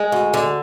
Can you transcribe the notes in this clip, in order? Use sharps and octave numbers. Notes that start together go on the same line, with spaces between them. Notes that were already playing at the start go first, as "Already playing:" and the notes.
Already playing: G#3
D2
D3